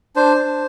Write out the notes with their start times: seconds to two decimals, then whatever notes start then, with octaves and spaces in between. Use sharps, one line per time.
0.16 D4 C5
0.37 D4